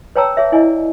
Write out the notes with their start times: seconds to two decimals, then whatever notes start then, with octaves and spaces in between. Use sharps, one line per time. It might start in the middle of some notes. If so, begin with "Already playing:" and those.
0.16 B4 C#5 G5 A5 A#5 E6
0.37 G#4 C#5 E5
0.52 E4 D5 D#5 G#5